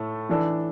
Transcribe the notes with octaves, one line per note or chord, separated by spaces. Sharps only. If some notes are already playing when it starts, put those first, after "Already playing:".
Already playing: A2 A3 A4
E3 D4 A4